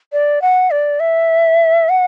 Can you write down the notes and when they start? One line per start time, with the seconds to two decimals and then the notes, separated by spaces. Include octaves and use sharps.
0.13 D5
0.42 F#5
0.71 D5
1.00 E5
1.89 F#5